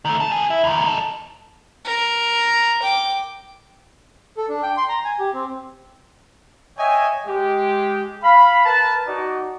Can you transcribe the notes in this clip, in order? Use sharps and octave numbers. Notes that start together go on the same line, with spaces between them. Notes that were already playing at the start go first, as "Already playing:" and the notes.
D#3 A3
B2 A5
F3 G#4
E4
E2 D#3
D#4 A4
A#4
G5 D6
A4
D4
G5
C6
A#5
G#5
G4
C4
C#5 D#5 E5 G5 G#5
G#3 G4
F5 B5
A#4 B4 A5
D#4 F#4 D5